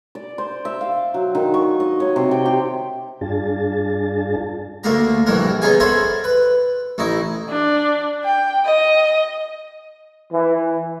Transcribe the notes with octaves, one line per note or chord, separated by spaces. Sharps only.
D5
C5
E5
F5
F#3
D#3
C#6
D#5
C#5
C3
G5
G4
G2 D4 F4 G#4 A5
D2 A3 A#3 A#5
A#1 G2 E3 A#4
B3 C#4 D#4 G#4 G#5
A4 A#4 C5 C#5 E5 B5
B4
A1 D#4 E4
D4
G5
D#5
E3